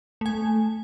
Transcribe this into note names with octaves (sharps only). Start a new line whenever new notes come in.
A3 G#5